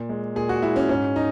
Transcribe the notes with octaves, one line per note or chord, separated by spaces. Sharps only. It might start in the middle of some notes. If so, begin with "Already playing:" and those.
Already playing: A#2
G#3
A#2 G#4
F#4
G#3 E4
C#4
G#2 C#4
D#4